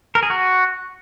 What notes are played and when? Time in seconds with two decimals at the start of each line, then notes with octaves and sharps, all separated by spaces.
0.15 A#4
0.23 G#4
0.30 F#4